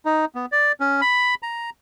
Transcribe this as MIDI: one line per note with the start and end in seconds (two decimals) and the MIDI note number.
0.05 0.25 63
0.35 0.46 59
0.52 0.72 74
0.80 1.01 61
1.01 1.35 83
1.43 1.70 82